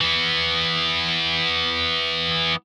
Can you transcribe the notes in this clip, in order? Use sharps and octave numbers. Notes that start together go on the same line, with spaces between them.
E3 B3